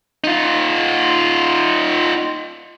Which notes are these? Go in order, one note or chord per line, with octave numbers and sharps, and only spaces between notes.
D#4 F4